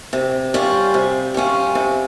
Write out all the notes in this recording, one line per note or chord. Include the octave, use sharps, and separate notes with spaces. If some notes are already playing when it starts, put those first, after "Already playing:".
C3
G3 C#4 F4
C3
G3 C#4 F4
C3